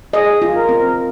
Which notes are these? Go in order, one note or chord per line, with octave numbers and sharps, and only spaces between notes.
G#4 D#5
F4
A#4
C4